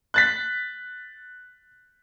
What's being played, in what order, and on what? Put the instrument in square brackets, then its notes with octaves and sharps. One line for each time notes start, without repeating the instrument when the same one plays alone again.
[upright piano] F#6 A6 B6